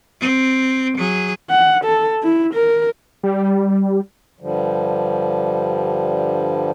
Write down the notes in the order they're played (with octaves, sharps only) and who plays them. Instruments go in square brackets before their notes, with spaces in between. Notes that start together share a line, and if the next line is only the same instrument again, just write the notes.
[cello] C4
F#3 G#4
[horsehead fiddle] F#5
A4
E4
A#4
[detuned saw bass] G3
[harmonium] G2 D3 F3 G3